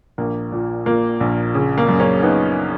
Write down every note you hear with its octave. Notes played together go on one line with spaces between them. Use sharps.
A#1 A#3
A#2
A#2 A#3
A#1
C#3
A#3
F#2
A#3 C#4
B3 D#4